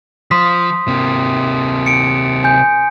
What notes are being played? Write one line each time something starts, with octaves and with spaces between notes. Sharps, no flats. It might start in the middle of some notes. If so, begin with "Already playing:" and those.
F3 C6 D#6 B6
C3 A#3
C#7 D7
G#5 G6